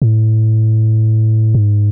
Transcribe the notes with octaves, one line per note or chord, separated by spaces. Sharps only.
A2
G#2